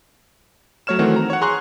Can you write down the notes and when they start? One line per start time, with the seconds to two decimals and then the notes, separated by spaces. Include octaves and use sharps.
0.87 F#3 A3 C#5 F6 E7
0.99 D#3 E3 A3 C4 F#4
1.16 A#5
1.30 C#5 F#5
1.41 G#4 A#5 C6 C#6 F#6